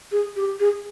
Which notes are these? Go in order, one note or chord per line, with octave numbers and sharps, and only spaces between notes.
G#4
G4
G#4